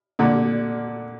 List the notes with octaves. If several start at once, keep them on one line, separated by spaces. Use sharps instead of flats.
A#2 D3